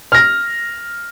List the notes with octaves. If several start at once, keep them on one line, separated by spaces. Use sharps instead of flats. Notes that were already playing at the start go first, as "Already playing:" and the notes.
F6 A#6